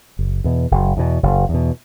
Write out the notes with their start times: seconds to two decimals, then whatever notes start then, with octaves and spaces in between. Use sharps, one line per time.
0.19 F#1
0.44 E2 B2
0.71 F#1
0.97 E2 B2
1.23 F#1
1.49 E2
1.54 B2